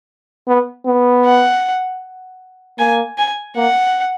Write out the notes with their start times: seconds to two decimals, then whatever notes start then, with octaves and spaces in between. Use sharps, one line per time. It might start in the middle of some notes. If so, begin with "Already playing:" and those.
0.48 B3
0.86 B3
1.25 F#5
2.79 A#3 G#5
3.18 G#5
3.56 A#3 F#5